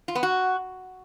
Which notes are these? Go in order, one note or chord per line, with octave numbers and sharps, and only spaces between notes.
F4
B3
F#4